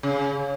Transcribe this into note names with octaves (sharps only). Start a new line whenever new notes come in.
C#3